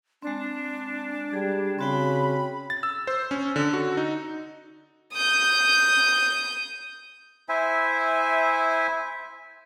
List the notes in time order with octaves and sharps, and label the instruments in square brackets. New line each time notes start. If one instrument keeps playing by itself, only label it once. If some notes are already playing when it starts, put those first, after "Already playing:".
[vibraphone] G#3 C4 [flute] D4
[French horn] G3 [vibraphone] G#4
[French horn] C#3 [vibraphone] C4 F#4 G5 [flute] B5
[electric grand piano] A6
E6
C5
C#4
D3
F#4
D#4
[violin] D#6 G6
[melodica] E4 C5 E5 G#5